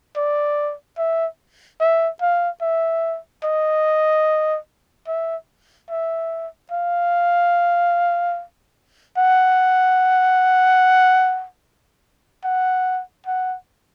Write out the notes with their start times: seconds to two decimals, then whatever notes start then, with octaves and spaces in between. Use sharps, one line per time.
0.16 D5
0.98 E5
1.80 E5
2.21 F5
2.61 E5
3.44 D#5
5.07 E5
5.90 E5
6.71 F5
9.17 F#5
12.44 F#5
13.27 F#5